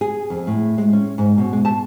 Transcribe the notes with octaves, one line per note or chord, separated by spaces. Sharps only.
G#4
F2
A2
G#3
C#4
G#2
B2
G#3
A5